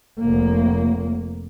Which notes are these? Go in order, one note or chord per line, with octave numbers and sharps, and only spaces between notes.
F1 A#3